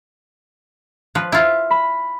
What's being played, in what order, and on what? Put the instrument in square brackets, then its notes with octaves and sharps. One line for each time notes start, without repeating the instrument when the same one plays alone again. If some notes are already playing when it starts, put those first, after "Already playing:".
[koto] F3 B4
E4 F4
[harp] B5